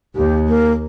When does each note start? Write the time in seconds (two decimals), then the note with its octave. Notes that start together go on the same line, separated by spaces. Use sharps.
0.16 D#2 G4
0.48 A#3